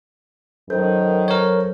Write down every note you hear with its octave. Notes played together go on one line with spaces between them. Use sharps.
F#2 D#3 A4 C5 G6
A#4 C#5